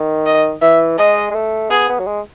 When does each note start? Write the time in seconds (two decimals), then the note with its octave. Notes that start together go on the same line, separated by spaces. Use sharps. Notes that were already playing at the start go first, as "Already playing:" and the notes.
Already playing: D#3
0.26 D#5
0.61 E3 E5
0.98 G#3 D#5
1.31 G#3
1.35 A3
1.70 B3 G#4
1.89 B3
1.99 F#3
2.07 G#3